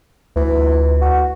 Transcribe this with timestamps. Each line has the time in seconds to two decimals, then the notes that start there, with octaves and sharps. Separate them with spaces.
0.36 D2 E3
1.01 F#4